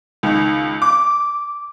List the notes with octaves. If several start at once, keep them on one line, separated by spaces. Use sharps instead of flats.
C#2 D#3
D6